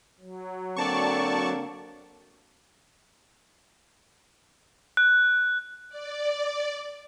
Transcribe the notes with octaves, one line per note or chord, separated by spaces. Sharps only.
F#3
D3 A#3 C4 D5 A5 C#6
F#6
D5